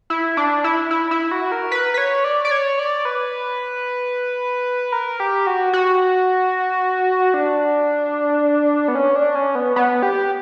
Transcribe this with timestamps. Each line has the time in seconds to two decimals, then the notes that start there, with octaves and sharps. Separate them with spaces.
0.10 E4
0.37 D4
0.64 E4
0.91 E4
1.11 E4
1.31 F#4
1.52 A#4
1.72 B4
1.94 B4
1.98 C#5
2.24 D5
2.45 D5
2.51 C#5
2.79 D5
3.05 B4
4.92 A#4
5.20 G4
5.47 F#4
5.73 F#4
7.34 D4
8.88 B3
8.95 C#4
9.16 D4
9.35 C#4
9.55 B3
9.76 B3
10.03 G4